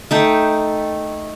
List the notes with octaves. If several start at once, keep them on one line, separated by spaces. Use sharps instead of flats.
A3 D#4 G5